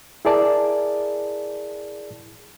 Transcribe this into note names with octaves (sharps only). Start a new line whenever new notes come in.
E4 G#4 A#4 D5 A5